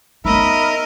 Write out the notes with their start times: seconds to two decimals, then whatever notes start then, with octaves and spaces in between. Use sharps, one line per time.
0.25 B3 D#4 A#4 D#5 E5 B5